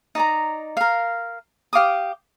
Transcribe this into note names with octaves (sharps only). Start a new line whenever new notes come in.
D#4 D5 A#5
A#4 F5
G4 F5 D6 D#6